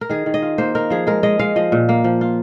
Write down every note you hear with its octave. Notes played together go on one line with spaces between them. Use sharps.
A#4
D#3 G#4
D#3
D#5
F4
A#3 C5
D#4 A#4
F3 G#4
G#3 A#4
G#3 D#5
G#3 F5
F3 D#5
A#2
A#3
F3
F4